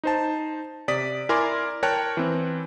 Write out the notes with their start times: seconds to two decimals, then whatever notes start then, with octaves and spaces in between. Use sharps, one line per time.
0.03 D#4 C5 A5
0.88 C3 D5 D#6 B6
1.29 E4 A#4 D5 G#5 C6 D6
1.83 A#4 C#5 G5 A5 F#6 D7
2.17 E3 C4